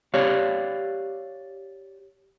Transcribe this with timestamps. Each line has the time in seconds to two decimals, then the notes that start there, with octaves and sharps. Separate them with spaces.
0.14 G4 C#5 D5 F5